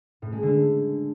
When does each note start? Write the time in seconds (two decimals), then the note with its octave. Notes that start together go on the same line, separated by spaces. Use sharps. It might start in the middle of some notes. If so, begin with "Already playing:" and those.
0.22 A2
0.32 G#3
0.43 D3